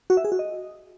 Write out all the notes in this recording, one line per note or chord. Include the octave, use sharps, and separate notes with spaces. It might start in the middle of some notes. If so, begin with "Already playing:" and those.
F#4
E5
G#4
F#4
D#5